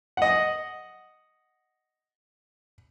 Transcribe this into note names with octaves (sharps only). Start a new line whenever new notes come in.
D#5 F#5